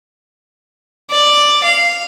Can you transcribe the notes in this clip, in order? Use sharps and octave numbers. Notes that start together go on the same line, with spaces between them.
D5
F5